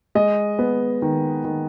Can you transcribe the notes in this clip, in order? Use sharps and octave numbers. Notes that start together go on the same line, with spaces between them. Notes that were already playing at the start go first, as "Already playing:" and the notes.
G#3 D#5
B3
D#3
D#3